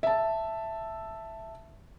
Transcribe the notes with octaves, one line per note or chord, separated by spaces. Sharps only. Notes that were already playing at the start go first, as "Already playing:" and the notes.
E5 A5